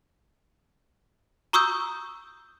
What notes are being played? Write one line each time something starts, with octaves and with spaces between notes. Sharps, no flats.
A#5 C#6 D#6 E6 G6